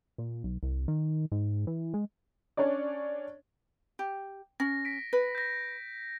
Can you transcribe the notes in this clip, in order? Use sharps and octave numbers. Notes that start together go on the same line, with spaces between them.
A#2
B1
C2
D#3
G#2
E3
G#3
C#4 D4 C#5 D5
G4
C#4 A#6
B6 D7
B4
G6 A#6